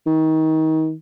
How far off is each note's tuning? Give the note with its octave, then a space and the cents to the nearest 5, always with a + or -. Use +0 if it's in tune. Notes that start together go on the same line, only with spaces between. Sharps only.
D#3 +30